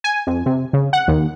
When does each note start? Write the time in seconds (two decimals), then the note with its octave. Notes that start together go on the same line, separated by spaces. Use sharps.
0.04 G#5
0.27 F2
0.46 C3
0.73 C#3
0.93 F#5
1.08 D#2